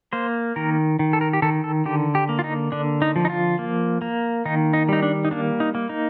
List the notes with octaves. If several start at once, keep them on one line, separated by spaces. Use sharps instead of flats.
A#3 C5
D#3 A#4
D#3
A4
A#4
G4
D#3 A4
A4
D3 G4
G4
A#3
F4
D#4
D3 D4
D#4
F3
D#4
F4
A#3
A#3
D#3 D#4
D#4
G3 D#4
D4
D#4
A#3 D4
D#4
A#3
D#4